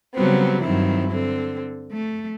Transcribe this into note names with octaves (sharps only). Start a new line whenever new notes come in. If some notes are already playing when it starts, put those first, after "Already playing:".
C#3 F#3 G3 B3 C4
G2 D#3 F#3 C4 E4
D3 C4
A3